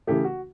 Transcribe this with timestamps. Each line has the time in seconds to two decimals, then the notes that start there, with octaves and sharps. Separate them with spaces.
0.07 C#3 E3 A3 G4
0.24 F#4